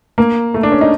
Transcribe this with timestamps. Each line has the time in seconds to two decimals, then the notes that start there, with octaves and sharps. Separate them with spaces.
0.18 A#3
0.54 A3
0.63 D4
0.72 C#4
0.81 D#4